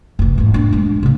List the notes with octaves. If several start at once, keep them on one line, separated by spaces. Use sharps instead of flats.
F1 E3
G#1 F4
B3 D4
G#3
C#3 A#3